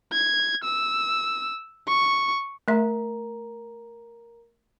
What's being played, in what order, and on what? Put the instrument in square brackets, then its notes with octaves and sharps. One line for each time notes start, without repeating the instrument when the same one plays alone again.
[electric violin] G#6
E6
C#6
[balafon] A3 E5 [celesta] A#4 A#5